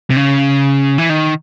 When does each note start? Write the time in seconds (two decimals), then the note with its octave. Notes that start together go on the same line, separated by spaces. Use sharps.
0.10 C3
0.16 C#3
0.98 E3
1.10 D#3